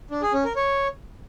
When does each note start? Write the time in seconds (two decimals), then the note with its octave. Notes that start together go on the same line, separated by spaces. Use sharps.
0.11 D4
0.22 G#4
0.33 C#4
0.45 A#4
0.56 C#5